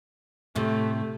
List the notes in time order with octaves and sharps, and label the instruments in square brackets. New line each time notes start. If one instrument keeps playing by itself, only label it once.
[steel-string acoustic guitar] A2 C3 [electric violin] A3